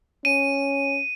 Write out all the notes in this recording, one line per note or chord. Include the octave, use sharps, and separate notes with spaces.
C#4 D#7